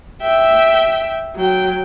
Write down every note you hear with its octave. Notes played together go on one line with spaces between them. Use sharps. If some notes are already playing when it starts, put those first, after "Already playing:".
E5 G5
F#3 G5